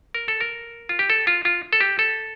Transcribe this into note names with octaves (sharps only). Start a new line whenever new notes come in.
A#4
A4
A#4
F4
G4
A4
F4
F4
A4
G4
A4